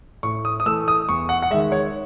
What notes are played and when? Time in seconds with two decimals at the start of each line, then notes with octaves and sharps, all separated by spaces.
0.23 A2 C#6
0.45 D#6
0.60 D#6
0.66 E3 A3 E6
0.88 D#6
1.09 E2 C#6
1.29 F#5
1.42 F#5
1.51 G#3 E5
1.54 D#3
1.72 C#5